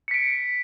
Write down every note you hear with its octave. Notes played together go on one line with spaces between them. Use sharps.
B6 C#7 D7